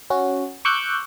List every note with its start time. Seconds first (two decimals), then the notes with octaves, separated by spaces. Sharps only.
0.10 C#4 F#4
0.65 C#6 D6 E6 F#6 G6